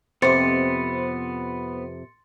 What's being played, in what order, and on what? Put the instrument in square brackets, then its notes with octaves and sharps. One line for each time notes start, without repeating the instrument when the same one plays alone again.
[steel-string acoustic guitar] F2 C3 [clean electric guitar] B3 [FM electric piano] C5 [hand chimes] C6 A6 C#7